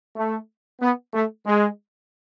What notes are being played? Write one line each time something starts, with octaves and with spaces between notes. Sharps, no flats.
A3
B3
A3
G#3